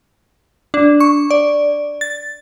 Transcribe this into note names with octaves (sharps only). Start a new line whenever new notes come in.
D4
C#6
D5
A6